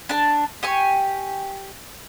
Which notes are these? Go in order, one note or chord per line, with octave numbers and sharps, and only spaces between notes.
D4 A5
G4 G#5 C#6